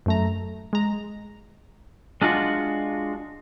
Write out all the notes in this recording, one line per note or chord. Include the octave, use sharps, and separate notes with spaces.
F#2 A3 A#5
G#3 A#5
G#3 D4 F4 F#4